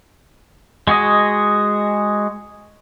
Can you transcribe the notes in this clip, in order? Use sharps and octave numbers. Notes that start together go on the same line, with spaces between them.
G#3 F#4 G#4 D#5